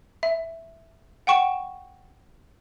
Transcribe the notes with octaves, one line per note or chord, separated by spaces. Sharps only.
E5
F#5 G5 C#6 E7